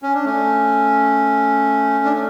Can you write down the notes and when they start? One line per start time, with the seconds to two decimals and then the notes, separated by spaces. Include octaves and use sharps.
0.03 C#4
0.14 D4
0.25 A3 C#4
2.05 D4
2.13 C#4